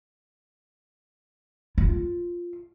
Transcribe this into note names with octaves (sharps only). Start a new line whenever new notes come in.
F4